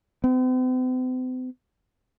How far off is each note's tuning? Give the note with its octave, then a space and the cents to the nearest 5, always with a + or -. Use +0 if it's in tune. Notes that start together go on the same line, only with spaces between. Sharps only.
C4 -45